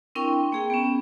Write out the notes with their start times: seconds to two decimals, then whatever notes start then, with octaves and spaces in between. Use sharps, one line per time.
0.15 C4 D4 E4 A#4 G5 C#6
0.52 A#3 G#4 G5
0.70 B3 C#4